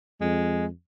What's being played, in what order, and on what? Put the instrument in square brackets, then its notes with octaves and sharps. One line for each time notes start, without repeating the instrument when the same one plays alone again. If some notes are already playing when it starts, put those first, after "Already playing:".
[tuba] F2 [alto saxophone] G#3